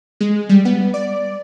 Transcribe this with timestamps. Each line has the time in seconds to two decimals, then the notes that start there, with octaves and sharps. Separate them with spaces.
0.20 G#3
0.49 G3
0.65 B3
0.94 D5